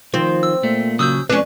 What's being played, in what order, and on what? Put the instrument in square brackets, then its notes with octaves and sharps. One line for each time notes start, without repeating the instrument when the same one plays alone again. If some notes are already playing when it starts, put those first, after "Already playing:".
[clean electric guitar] D#3 [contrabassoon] F3 [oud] C4
[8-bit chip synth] E6
[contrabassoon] A#2 [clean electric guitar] A3
[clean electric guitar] C#3 F#3 [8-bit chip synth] D#6 E6 G6
[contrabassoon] F2 [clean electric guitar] G#3 [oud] C#4 D4 [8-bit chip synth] B4